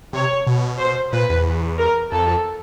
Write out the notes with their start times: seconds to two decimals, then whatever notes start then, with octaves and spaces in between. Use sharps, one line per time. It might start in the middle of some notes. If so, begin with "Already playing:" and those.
0.13 C3 C#5
0.47 B2
0.80 C5
1.12 A#2 B4
1.30 E2
1.79 A#4
2.12 F2 A4